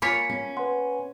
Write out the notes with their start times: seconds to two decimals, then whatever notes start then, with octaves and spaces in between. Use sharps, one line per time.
0.02 A#3 F4 C#5 G#5 B5 B6 C#7
0.29 C#4
0.57 B4 F#5 C6